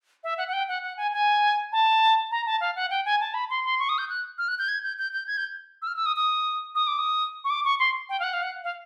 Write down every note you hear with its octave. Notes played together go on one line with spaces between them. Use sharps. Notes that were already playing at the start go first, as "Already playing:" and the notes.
E5
F#5
F#5
G5
F#5
F#5
G#5
G#5
A5
A#5
A5
F5
F#5
G5
G#5
A5
B5
C6
C6
C#6
D#6
G6
F#6
F6
F#6
G6
G#6
G6
G6
G6
G#6
G6
E6
F6
E6
D#6
D#6
D#6
D6
D#6
C#6
D6
C#6
C6
G5
F5
F#5
F5
F#5
F5